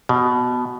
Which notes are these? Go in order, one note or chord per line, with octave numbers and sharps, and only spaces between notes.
B2